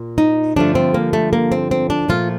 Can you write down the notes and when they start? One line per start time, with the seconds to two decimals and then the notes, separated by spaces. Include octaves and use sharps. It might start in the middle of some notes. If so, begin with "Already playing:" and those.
Already playing: A#2
0.18 D#4
0.56 G2 D3 F3 A3 D4
0.75 C4
0.94 A#3
1.13 A3
1.33 A#3
1.52 C4
1.71 C4
1.90 D4
2.08 A#2 F3 A3 F4